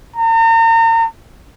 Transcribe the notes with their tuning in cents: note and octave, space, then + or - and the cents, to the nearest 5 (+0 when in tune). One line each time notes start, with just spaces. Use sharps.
A#5 -40